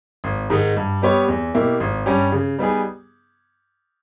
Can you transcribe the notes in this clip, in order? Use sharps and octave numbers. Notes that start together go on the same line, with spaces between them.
G#1
G#2 D#3 G#3 D#4
G2
G3 B3 G4 C#5
E2
B2 A#3 E4 G4
G#1
G2 G3 C#4 G4
C#3
G3 B3 D#4 G#4